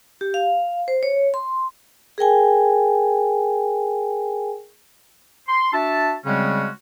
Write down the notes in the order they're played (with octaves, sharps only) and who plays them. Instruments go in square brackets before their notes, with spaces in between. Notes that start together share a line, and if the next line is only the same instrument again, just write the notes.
[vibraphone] G4
F5
C5
C#5
C6
G#4 A#4 G5 G#5
[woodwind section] C6
D4 F#4 E5 A5
C#3 G3 G#3 C4 C#4 F#4